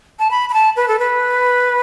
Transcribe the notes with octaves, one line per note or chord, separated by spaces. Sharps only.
A5
B5
B5
A5
B4
A4
B4